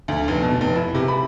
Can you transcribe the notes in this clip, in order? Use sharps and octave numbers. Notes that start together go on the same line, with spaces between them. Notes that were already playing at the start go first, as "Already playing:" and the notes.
D2
F1
B2
F1
E4
C3
B5